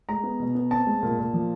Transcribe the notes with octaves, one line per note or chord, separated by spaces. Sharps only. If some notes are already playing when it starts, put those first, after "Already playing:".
G#3 A#5
B3
B2
B3
C4 A5
G#3
A#2
A#2
F3